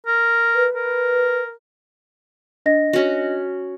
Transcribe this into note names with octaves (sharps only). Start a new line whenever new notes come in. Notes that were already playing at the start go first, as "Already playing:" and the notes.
A#4
B4
A#4
D4 D#5 A#6
C#4 F#4